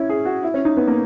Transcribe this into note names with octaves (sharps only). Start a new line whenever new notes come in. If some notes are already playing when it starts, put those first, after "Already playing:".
Already playing: C#4 E4
G#4
F#4
E4
C#4
D#4
B3
A#3